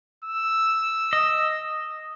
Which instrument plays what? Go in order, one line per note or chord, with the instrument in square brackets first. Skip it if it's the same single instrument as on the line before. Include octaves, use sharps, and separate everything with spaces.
[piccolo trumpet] E6
[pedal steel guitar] D#5